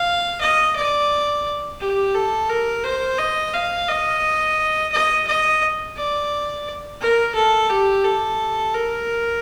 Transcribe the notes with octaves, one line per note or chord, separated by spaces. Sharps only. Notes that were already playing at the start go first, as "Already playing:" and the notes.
Already playing: F5
D#5
D5
G4
A4
A#4
C5
D#5
F5
D#5
D#5
D#5
D5
A#4
A4
G4
A4
A#4